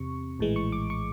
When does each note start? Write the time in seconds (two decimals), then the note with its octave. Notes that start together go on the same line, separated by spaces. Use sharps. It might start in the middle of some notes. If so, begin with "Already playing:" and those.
Already playing: E2 C3 C#6
0.39 A#1 A2 E3 G#3
0.56 C#6
0.72 D6
0.90 C#6